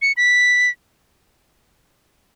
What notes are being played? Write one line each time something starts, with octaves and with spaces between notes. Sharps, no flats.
C#7
B6